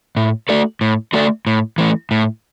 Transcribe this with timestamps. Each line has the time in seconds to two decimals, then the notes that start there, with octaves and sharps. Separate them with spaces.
0.17 A2
0.49 A3 F#4 A4 D5
0.81 A2
1.13 A3 F#4 A4 D5
1.47 A2
1.78 E3 A3
2.11 A2